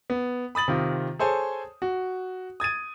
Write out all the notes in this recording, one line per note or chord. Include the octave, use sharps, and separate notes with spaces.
B3
B5 D#6 A6 F#7
C3 D#3 F4
G#4 A4 C5 C#5 G#5
F#4
D#6 G#6 A6 D#7